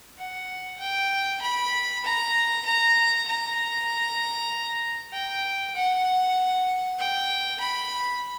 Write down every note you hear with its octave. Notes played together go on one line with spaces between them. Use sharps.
F#5
G5
B5
A#5
A#5
A#5
G5
F#5
G5
B5